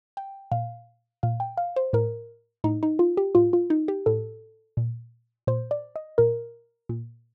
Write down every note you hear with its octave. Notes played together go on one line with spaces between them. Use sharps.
G5
A#2 F5
A#2 F5
G5
F5
C5
A2 A#4
A2 D#4
D#4
F4
G4
A2 F4
F4
D#4
G4
A2 A4
A#2
A#2 C5
D5
D#5
A#2 A#4
A#2